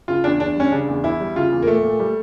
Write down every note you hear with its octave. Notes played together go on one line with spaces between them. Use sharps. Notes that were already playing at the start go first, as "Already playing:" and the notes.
C#3 F4
E2 D4
E2 D4
G3 C#4
C#3 D4
E2
E2 E4
G3
C#3 F4
E2
A#3
A#2 A3
A#2
G3